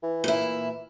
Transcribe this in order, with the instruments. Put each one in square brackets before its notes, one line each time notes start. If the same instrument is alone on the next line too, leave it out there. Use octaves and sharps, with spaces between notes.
[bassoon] E3
[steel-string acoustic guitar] A#2 E4